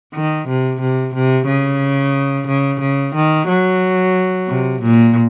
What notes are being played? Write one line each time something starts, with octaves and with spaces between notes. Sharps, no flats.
D#3
C3
C3
C3
C#3
C#3
C#3
D#3
F#3
C3
A#2